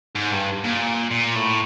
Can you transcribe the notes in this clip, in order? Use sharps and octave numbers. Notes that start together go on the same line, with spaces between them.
G#2
G2
A#2
A#2
A2